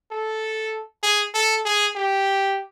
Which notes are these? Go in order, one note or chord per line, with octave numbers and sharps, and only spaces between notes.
A4
G#4
A4
G#4
G4